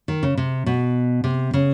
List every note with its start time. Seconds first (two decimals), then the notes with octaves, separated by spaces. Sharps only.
0.08 D#3
0.23 C#3
0.37 C3
0.66 B2
1.24 C3
1.54 C#3